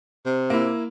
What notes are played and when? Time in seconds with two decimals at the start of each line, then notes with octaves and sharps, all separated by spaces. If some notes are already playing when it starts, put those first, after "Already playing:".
0.26 C3
0.50 A#3 E4